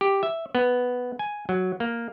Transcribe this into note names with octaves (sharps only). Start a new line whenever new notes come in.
G4
E5
B3
G#5
F#3
A#3